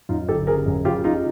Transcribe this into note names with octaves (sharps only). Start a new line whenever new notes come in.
F#2 D#4 F4
G1 G4 A4
C#3 G#4 A#4
F#2
C#3 F4 G4
C#3 D#4 F4